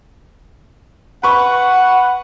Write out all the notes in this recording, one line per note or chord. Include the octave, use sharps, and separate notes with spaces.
B4 F#5 C#6